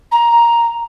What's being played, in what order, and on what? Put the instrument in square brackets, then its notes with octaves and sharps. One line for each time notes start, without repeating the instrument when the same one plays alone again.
[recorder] A#5